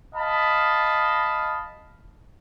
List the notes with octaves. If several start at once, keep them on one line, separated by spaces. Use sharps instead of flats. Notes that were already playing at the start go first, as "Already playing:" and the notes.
D#5 F5 A5 B5